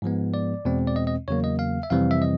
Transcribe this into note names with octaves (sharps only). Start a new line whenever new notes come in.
G#2 F3 G#3 B3
D5
E2 B2 G#3 C4
D5
D#5
D#5
E2 C#3 F#3 A#3 C#5
D#5
F5
E5
F2 C3 E3 G3 C4 F5
E5
D#5